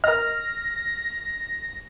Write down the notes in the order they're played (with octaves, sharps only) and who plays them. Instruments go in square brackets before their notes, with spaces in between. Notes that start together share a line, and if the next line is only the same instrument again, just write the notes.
[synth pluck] A#4 D#5 [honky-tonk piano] F6 [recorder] A#6